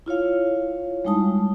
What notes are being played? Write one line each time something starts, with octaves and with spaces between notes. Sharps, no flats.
E4 F4 C#5 F5
G3 G#3 D#4 A5 D#6